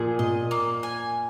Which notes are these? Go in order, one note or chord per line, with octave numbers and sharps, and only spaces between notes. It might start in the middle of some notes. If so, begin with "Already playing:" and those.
Already playing: A#2 F3 G#4
A#2 D#5
A#3
G#5